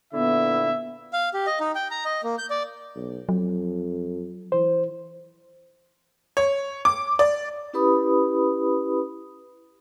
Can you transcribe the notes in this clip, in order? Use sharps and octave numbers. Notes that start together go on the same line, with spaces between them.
A#2 D3 B3 E4 E5
F5
G4
D#5
D#4
G5
A#5
D#5
A#3
G6
D5
B1
F2 F#3
E3 C5
C#5
D6
D5
C#4 E4 G4 B4 B5 D#6